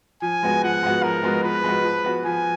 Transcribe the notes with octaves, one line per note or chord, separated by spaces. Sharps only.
F3 G#5
G#3 B3 F#4
F3 F#5
G#3 B3 F#4
F3 A#4
G#3 B3 F#4
F3 B4
G#3 B3 F#4
F3
B3 F#4
F3 G#5